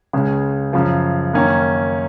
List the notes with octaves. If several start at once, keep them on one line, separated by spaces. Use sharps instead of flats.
C#2 C#3 G#3
F#2 C#3 F3
F#2 D#3 A#3 C#4